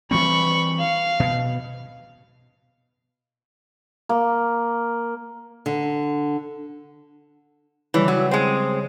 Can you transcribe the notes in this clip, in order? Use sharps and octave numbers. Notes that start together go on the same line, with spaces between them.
E3 G3 C4 B5 C#6
F5
B2
A#3
D3
C#3 E3 G3
F#3
G#3 C4